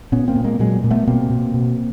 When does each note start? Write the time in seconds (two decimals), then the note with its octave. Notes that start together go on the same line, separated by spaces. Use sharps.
0.12 A#2 B3 C#4
0.28 A#3 C4
0.36 A#2
0.44 G#3 A#3
0.59 A#2 F#3 G#3
0.84 A#2
0.91 A3 B3
1.07 B2 A#3 C4
1.30 B2
1.54 B2